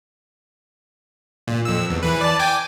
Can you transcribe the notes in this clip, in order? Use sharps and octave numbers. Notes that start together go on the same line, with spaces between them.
A#2
F2 E6
E2
E3 B4
D5 A5
G5 G#5 D6